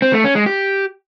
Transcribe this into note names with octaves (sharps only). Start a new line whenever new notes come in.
C4
A3
C#4
G#3
G4